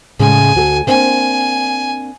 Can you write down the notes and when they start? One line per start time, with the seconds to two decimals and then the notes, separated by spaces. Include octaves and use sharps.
0.19 A2 C#3 G#3 G#5
0.55 D2 F#4 A4
0.87 A#3 C4 D4 G#5